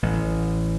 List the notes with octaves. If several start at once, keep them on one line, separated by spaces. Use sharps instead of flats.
A1